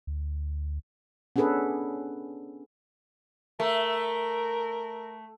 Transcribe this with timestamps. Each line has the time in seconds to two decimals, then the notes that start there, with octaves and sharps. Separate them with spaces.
0.07 D2
1.36 B3 C#4 D4 G#4 A4 B4
3.60 A3 A#4